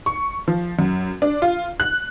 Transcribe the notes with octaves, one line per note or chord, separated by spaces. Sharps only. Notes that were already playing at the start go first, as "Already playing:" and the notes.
C#6
F3
F#2
D4
F4
F#6